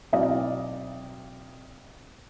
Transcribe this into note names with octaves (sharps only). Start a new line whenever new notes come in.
B1 C4 E4 D5 D#5 F5